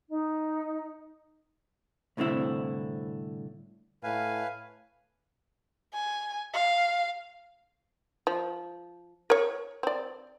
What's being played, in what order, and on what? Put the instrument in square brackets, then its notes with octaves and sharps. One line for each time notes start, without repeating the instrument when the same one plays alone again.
[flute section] D#4
[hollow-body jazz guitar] C2 A2 D3 C4 E4
[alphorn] A2 [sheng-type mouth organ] B4 F5 G#5
[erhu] G#5
F5
[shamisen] F3
A#4 C#5
C4 D5